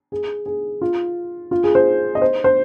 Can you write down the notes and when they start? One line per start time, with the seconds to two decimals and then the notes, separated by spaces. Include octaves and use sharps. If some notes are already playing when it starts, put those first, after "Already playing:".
0.12 G#4
0.46 G#4
0.81 F4
1.51 F4
1.64 G#4
1.75 C5
2.15 D#5
2.22 C5
2.44 C5